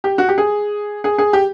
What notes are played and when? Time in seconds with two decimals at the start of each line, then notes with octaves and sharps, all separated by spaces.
0.04 G4
0.18 F#4
0.29 G4
0.38 G#4
1.04 G#4
1.18 G#4
1.33 G4